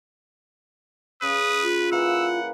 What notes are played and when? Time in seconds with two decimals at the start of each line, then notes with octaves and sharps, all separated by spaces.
1.22 C#3 B4 D#6
1.63 F4
1.92 E3 A#3 B4 F#5 E6